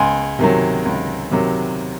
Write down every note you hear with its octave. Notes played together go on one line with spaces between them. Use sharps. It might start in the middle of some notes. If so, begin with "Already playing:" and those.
Already playing: C#2 G#5 C6
C3 D#3 F#3
C#2
C3 D#3 F#3